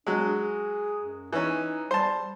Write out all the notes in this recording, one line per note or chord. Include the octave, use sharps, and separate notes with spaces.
F#3 G#3 D4
G#4
F#2
E3 C#4 D#4
G3 C5 A5